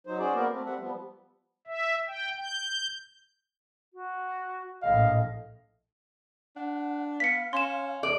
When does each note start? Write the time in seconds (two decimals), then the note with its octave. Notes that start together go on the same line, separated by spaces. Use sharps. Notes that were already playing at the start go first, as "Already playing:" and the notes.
0.07 F#3 D#4 C5
0.19 C#4 F#4 G#4 C5 D5
0.35 A#3 B3 F#4 A#4 D5
0.51 A3 C4
0.65 G3 C4 E5 F#5
0.80 F3 G3 B3
1.67 E5
2.08 G5
2.41 G6
3.93 F#4
4.82 A#1 A2 D#5 F5
6.56 D4 F#5
7.20 B3 F5 B6 C#7
7.53 C#4 C6 E7
8.03 E2 A4 D5 E5